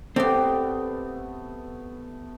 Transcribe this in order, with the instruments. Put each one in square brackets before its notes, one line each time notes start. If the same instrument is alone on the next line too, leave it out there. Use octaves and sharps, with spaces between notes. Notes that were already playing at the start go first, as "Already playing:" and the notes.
[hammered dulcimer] A3 B3 [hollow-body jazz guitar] C4 [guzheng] G4 D5